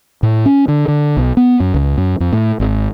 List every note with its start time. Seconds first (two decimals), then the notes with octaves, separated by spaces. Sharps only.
0.23 A2
0.46 C#4
0.68 D3
0.88 D3
1.17 B1
1.37 B3
1.60 F#2
1.74 C#2
1.98 F#2
2.20 F2
2.33 A2
2.60 G#1